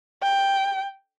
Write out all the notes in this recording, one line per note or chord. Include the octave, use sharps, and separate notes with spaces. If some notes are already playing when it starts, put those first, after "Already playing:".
G5